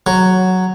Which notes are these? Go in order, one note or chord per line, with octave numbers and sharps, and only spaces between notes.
F#3